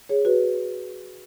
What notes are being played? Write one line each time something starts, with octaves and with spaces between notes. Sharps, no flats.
G#4 C#5
F#4 B4